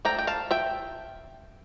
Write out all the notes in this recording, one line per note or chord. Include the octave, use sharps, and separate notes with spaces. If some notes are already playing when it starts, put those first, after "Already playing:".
F3 A3 D4 G5 A#5
G5
F5 A5
E5 G5